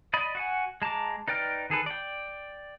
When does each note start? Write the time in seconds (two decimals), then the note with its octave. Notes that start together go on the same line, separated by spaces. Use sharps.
0.14 D5 D#5 B5
0.35 F#4 F#5 G#5
0.82 G#3 A5 A#5 D6
1.28 D#4 B4 D5 G5 F6
1.70 D#3 G#4 A4 B4
1.86 D5 G5